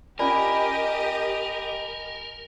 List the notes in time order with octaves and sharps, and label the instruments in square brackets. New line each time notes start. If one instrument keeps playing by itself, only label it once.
[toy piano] C#4 F4 D5 [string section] G4 D#5 [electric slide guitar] A#4 [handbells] G#5 B5